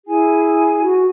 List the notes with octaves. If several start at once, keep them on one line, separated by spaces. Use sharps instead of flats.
E4 G#4 G#5
F#4